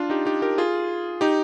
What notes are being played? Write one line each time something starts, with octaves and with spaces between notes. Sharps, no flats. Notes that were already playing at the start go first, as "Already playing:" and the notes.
Already playing: D4 F4
D#4 G4
D#4 G4
G4 A#4
F4 G#4
D#4 G4